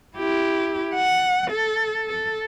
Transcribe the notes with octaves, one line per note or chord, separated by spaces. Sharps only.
E4 G4
F#5
A4
A4